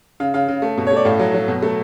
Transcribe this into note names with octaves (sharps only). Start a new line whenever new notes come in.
C#3 F5
C#3 F5
C#3
A3
B2
A3 C#5
D5
A2 F5
F#3
F#3
B2
A3